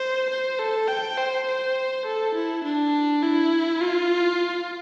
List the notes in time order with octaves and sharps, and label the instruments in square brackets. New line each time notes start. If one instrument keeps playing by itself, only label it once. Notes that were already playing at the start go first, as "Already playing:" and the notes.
Already playing: [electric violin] C5
C5
A4
G5
C5
C5
A4
E4
D4
E4
F4